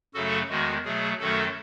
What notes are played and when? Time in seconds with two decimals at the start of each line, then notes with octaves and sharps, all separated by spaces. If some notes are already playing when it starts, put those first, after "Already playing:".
0.14 F#2 C#3 F#3 A3 F#4 A4
0.49 E2 D#3 G#3 F#4
0.85 B2 F#3 A3 G#4
1.20 F#2 D#3 F#3 A3 F#4 A4